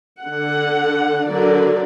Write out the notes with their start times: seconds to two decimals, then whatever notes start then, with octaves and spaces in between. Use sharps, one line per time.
0.23 D3 F#5
1.28 D3 F#3 A#4 D5